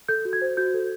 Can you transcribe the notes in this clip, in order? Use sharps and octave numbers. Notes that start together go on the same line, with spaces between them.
A4 G6
F#4
G#6
C5
F#4 G6
A4